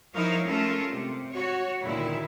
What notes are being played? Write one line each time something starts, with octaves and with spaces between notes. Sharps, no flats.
F3 D#4 E4 A#4 C#5 F5
A3 C#4 F4 A4 A#4
C3
F#4 C#5
D2 A#2 D#3 E4